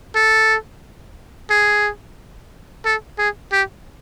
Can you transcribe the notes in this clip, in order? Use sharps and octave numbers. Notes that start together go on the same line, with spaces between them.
A4
G#4
A4
G#4
G4